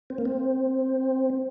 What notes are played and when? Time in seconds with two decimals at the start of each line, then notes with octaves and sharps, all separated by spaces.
0.10 C4
0.18 A#3
0.25 C4